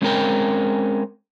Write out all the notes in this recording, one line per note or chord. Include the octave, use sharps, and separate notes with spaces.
G#3 C4 C#4 E4 A#4 G5